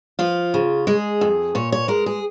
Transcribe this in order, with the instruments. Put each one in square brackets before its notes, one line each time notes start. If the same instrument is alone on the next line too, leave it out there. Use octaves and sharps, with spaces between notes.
[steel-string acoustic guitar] F3 F4
C#3
G#3 G#4
F2
A#2 C#5
C#5
G#3 A#4
G#4